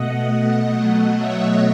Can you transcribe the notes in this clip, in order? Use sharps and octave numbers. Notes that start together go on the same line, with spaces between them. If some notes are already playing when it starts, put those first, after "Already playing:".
Already playing: B2 A3 D#5 F#5
B2 F#3 A3
C#5 E5